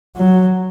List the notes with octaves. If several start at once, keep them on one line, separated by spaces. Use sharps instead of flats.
F#3